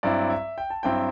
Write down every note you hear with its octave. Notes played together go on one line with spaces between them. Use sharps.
G2 F#3 C4 E4 D5
E5
G5
A5
G2 F#3 C4 E4 G5